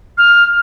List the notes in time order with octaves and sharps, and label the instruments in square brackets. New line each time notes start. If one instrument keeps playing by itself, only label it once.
[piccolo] F6